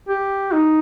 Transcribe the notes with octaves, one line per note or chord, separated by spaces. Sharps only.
G4
D#4